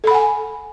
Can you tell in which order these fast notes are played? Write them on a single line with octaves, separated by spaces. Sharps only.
A4 B5 F#5 G#5